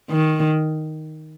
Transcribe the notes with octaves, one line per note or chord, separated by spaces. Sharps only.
D#3